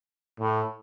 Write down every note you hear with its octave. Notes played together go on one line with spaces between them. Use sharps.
A2